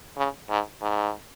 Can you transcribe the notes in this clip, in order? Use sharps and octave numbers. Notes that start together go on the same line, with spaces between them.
C#3
G#2
G#2